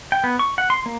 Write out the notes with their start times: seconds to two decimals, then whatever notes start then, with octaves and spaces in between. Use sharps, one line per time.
0.12 G5
0.24 B3
0.39 C#6
0.58 F#5
0.70 C6
0.86 A#3